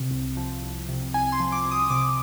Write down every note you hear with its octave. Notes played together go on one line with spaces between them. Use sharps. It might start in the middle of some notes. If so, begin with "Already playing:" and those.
Already playing: C3
C2
F3
C2
C3
C2 G#5
C6
F3
D6
C2
D#6
C3 D6